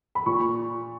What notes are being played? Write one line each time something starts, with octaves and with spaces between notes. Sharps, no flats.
B5
A#2 C#6